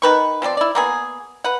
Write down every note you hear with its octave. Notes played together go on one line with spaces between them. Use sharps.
D#3 B4 C#6
F3 C4 A4 D5
E4 D5
A#3 B3 G#4
B4 F#5